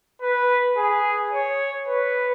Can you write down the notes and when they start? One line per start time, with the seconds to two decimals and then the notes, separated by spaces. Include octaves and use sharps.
0.22 B4
0.77 G#4
1.32 C#5
1.88 B4